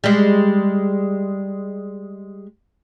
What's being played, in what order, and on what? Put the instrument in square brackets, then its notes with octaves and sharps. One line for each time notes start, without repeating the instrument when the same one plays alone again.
[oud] G3 G#3